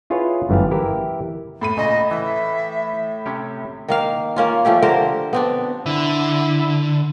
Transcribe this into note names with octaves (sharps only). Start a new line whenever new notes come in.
E4 F4 G#4 B4 C#5 F#5
G1 F#2 E3 A3 G4 F5
E3 E4 G4 A#4 E5
A2 B5 D#7
A#2 C#3 D#5
E3 E5
C3 C#4 G4
D#3 A#3 F5
A#3 C#4 F4
F3 A3 C#4 G4
D3 A#4 C5 F5
B3 C4 D4
D3 E4